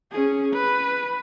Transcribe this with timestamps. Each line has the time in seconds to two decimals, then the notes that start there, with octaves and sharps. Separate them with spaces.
0.11 C#4 G#4
0.53 B4